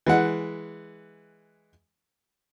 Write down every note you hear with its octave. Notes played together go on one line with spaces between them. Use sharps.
E3 G#3 F#5